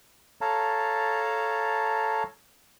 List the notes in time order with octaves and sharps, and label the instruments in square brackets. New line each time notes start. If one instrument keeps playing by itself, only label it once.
[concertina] A4 C#5 F5 A5 A#5